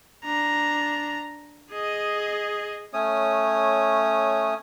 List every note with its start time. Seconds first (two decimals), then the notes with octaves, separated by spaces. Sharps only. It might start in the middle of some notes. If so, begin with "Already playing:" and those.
0.25 D4 A#5
1.71 G#4 D#5
2.93 A3 C#4 C#5 D#6